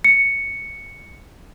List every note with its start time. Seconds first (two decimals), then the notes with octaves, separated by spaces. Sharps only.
0.04 C#7